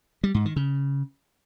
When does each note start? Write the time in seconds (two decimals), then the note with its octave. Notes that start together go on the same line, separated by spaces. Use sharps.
0.24 G3
0.34 G#2
0.45 D#3
0.56 C#3